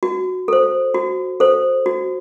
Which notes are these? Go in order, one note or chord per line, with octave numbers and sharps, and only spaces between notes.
F#4
A4 C5
F#4
A4 C5
F#4